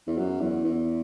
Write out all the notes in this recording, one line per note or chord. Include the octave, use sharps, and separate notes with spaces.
E2
F#2
E2
E2